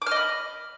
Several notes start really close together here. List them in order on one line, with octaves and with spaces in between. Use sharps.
D6 F6 D#5 B5